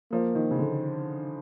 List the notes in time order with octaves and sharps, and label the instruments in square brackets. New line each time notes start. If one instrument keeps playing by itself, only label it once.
[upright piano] F3 [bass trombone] A#3
[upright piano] D#3
C#3
D3